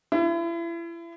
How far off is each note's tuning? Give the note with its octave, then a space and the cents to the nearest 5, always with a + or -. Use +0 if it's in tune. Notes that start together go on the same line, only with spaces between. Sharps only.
E4 +35